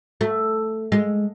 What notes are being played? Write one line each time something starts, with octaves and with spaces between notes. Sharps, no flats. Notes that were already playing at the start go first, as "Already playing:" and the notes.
A3
G#3